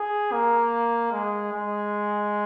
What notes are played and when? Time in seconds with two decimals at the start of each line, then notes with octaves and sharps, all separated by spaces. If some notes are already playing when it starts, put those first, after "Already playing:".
Already playing: G#4
0.32 A#3
1.12 G#3
1.53 G#3